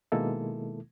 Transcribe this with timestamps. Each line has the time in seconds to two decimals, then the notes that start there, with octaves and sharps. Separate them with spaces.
0.12 B2 D#3 G#3 A#3 E4 A4